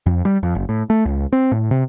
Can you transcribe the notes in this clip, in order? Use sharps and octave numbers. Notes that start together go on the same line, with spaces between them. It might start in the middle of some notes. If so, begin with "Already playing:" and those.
F2
G3
F2
F#1
A2
A3
C#2
C4
A2
C3